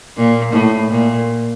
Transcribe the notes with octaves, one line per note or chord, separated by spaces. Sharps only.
A#2
A2
A#2